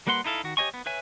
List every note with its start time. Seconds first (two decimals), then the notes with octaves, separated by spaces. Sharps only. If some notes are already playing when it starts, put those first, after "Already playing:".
0.07 G3 A#3 B4 F#5 C6
0.24 D#4 E4 A4 F5
0.44 D#3 F#4
0.57 G4 C#5 D#5 G#5 C#6
0.74 B3
0.86 B4 C#5 E5 G#5